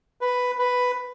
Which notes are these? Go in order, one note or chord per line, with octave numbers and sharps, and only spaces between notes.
B4
B4